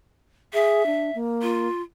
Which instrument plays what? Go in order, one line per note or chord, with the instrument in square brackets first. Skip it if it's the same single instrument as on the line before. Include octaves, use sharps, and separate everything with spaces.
[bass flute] G#4 [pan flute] E5
[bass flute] D4
A#3
[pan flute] F4